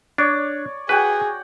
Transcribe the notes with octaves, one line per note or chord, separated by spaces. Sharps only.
D4 C#5 D5
F#4 G#4 B4 F#5 G5